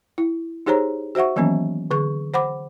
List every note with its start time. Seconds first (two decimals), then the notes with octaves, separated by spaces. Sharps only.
0.18 E4
0.66 D#4 G4 G#4 C5 C#5 A#5
1.15 F#4 C5 E5 F#5 C#6
1.36 D#3 E3 F#3 A#3 B3 C#4
1.91 D3 G#4 C#6
2.34 C5 F#5 B5 D6